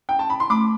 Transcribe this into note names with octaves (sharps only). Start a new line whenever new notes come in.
G5
A5
B5
C6
A3 B5 D6